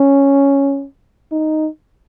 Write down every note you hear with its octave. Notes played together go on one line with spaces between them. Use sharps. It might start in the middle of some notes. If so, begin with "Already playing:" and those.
Already playing: C#4
D#4